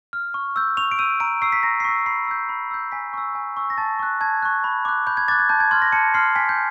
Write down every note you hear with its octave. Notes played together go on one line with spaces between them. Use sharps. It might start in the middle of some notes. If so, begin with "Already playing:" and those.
F6
C#6
E6 G6
C#6 F7
D7
E6 G6 D#7
A#5 D7
C#6 E6 C7
B6
A#5 A#6
C7
C#6 E6 B6
B5 C7
E6 G6
B5
E6 G6
G#5 B6
C#6 E6
G#5
C#6 E6
A#6
A5 A6
C#6 F#6
A5 G#6
C#6 F#6
B5
D6 F#6
B5 G6
G#6
D6 F#6 A6
G#6
A5 G6
G#6
C6 F6 G#6
A#6
A5 C#7
C6 F6 C7
G#5 B6
G6